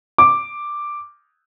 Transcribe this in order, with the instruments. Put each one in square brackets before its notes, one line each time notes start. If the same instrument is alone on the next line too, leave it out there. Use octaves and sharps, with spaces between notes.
[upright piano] D6